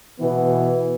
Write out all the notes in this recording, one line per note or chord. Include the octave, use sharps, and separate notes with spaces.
B2 E3 B3